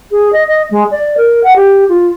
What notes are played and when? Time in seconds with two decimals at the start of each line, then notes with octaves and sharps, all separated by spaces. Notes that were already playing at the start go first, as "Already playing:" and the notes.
0.11 G#4
0.33 D#5
0.47 D#5
0.71 G#3
0.91 D5
1.17 A#4
1.44 F#5
1.56 G4
1.89 F4